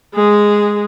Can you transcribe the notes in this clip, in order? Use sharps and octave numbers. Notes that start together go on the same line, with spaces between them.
G#3 G#4